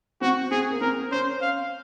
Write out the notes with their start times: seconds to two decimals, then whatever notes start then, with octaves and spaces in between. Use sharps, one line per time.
0.21 C4 F#4
0.51 C4 G#4
0.70 A#3
0.81 C4 A#4
1.11 C#4 C5
1.42 F5